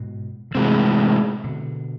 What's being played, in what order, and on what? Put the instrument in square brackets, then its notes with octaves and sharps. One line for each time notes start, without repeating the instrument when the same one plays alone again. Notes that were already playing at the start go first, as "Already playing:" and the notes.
Already playing: [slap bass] G#2 B2
D3
[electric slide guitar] A2 G#3 C4 [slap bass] C3 E3
[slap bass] B2 D3